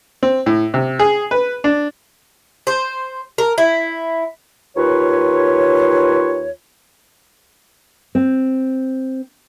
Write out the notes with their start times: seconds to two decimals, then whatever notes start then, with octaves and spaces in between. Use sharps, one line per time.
0.23 C4
0.46 A2
0.74 C3
0.99 G#4
1.31 B4
1.64 D4
2.67 C5
3.38 A#4
3.58 E4
4.76 D#2 F4 B4 C#5
8.15 C4